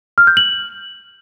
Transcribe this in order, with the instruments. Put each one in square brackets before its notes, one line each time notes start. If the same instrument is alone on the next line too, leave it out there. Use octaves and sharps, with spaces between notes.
[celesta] F6
G6
F#7